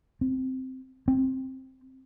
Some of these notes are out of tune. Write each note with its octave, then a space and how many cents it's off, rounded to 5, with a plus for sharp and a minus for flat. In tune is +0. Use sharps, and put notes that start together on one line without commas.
C4 -5
C4 +10